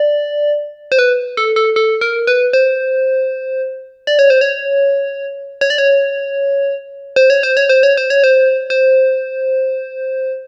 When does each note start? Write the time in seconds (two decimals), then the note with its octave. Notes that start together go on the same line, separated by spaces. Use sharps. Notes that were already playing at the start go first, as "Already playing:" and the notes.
Already playing: D5
0.92 C5
0.99 B4
1.37 A4
1.56 A4
1.76 A4
2.01 A#4
2.27 B4
2.53 C5
4.07 D5
4.19 C#5
4.30 C5
4.41 C#5
5.61 C#5
5.70 D5
5.78 C#5
7.16 C5
7.30 C#5
7.43 C5
7.57 C#5
7.69 C5
7.83 C#5
7.97 C5
8.10 C#5
8.24 C5
8.70 C5